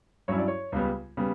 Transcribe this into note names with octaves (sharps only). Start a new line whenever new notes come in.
G2 F#3 C#4 E4 C#5
D5
C#5
C#2 C#3 G3 B3
C#3 G3 B3